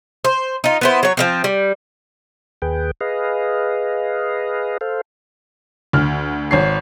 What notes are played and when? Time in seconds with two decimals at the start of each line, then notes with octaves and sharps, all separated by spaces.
0.24 C5
0.64 D#4 F4
0.81 B3 E4 C5
1.03 F#3 C#5
1.17 F3 G#3 C4
1.44 G3
2.62 D#2 G#4 B4 G5
3.01 G#4 B4 D#5 F5
4.81 A4 C5 F5
5.93 D2 F6
6.51 G#1 C#5 C7